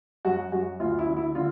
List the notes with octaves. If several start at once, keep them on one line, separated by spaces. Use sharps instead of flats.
F#2 F#4
F#2 F#4
D2 F4
E4
D3
E4
D3 F4